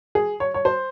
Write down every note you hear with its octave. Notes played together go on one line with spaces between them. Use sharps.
G#4
C#5
C#5
C5